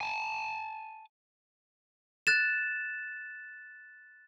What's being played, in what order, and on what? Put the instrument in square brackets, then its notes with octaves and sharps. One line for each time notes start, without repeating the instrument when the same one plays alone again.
[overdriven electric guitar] G#5 A5
[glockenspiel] F#6 A6 E7